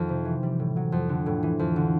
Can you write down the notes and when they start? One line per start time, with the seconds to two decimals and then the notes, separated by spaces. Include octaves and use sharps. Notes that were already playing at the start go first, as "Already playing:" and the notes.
Already playing: F2 D#3
0.09 C3
0.25 E3
0.43 G3
0.60 A2
0.76 F#3
0.92 F2
1.09 D3
1.26 A2
1.43 E3
1.59 F2
1.76 D3